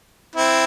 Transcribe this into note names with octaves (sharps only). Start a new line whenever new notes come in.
C4 E4